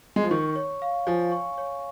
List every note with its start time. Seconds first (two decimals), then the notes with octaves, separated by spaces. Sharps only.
0.16 G#3
0.24 F3
0.31 D#3 C#6
0.56 C#5
0.82 F5
1.07 F3 G#5
1.32 C#6
1.58 C#5